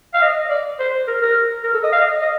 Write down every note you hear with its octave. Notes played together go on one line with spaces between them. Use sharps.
F5
D#5
D5
C5
A#4
A#4
A#4
A4
D#5
F5
D#5
D#5